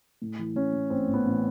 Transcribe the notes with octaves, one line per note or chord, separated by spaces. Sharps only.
A2
E3
A2 C#4
A2
A1 C4
A1
B3
A1